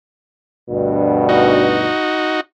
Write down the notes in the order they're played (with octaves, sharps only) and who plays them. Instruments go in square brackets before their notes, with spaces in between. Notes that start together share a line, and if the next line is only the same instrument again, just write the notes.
[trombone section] D2 G2 B2
[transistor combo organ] D#4 F#4